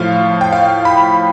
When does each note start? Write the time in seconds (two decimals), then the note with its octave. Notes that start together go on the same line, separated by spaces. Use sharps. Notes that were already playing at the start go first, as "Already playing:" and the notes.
Already playing: A2 F3 F5
0.41 G5
0.53 F5
0.85 B5